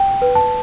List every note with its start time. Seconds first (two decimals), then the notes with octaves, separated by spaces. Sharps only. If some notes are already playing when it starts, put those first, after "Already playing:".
Already playing: G5
0.22 B4
0.35 A5